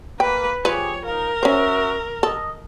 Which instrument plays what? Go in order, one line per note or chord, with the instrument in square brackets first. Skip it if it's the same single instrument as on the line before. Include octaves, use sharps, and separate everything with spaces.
[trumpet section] A#3 [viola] B4 [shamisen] G5
[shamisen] F3 B4 [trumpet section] G4 G#4 [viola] C#5
[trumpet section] D#4 F5 [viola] A#4
[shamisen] C#4 C5 [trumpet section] F#4 E5
[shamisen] A4 [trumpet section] D#5